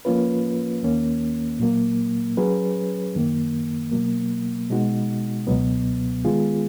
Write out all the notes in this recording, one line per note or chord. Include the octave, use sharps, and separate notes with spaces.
F3 A#3 C#4 F4 B4
D#2 D#3 A#3 C#4
A#2 F#3 A#3
F#3 C#4 G#4 B4
F#2 D#3 A#3
B2 F#3 A#3
B2 G#3 D#4 F#4
C#2 B2 F#3 B3
D#3 G#3 B3 F4 G#4